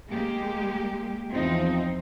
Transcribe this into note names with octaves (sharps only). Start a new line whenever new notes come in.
G#3 A#3 G4
E2 F3 C4 D#4